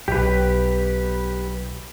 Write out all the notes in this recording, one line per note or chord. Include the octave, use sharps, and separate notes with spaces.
B1 G4 B4